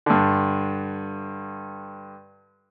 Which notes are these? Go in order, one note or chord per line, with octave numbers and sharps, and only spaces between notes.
G2 D3